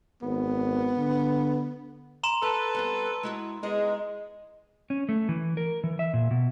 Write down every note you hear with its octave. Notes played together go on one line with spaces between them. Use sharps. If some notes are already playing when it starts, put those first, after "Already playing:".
G#1 B3
D3
A#5 C6 E7
A4 B4 A5
G3 B3 C4
G#3 E4 F#4
G#3 B3 D#4 D#5
C#4
A3
E3
A#4
E3
E5
A#2
B2